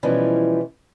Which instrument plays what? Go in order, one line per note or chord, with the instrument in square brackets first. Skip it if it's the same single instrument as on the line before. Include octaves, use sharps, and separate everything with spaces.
[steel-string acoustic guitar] B2 E3 F3 G3 C#4 E4